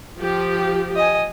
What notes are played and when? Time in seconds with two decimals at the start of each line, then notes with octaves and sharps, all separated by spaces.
0.20 F3 G4
0.96 D#5 G#5